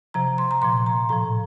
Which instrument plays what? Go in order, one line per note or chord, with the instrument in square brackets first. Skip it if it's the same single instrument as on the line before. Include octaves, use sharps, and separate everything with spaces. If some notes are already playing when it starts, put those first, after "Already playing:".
[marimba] C3 F3 A#5
C6
A#5
A#2 F3 C6
A#5
A2 F3 A#5